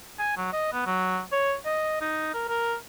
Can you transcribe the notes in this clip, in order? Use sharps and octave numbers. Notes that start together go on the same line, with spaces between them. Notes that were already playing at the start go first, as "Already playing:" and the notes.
G#5
F#3
D#5
B3
F#3
C#5
D#5
D#4
A#4
A#4